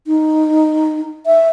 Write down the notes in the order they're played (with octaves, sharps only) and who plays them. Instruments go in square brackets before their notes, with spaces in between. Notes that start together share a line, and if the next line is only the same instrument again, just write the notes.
[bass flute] D#4
E5